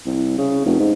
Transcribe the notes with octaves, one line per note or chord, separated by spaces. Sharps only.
C2
C#3
F1
G#2